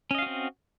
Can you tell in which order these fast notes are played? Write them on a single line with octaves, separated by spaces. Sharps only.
C#4 D#5 F5 F#4 C4